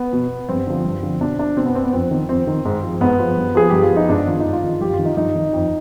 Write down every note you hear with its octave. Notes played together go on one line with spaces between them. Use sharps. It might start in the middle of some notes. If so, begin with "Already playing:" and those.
Already playing: B3
B2
G2 C4
D3 F3
G2
D3 F3
B2 D4
D4
B2 C4
B3
C4
B3
F2 C4
D#3
F2 C4
D#3
G#2
F3
G#2 B3
F3
G2
F3 G#4
G2 G4
F4
F3
D#4
G#2 D4
D#3 F4
D#4
G#2
F4
D#3
G2 G4
F4
D#3
D#4
G2 D#4
D#3
F2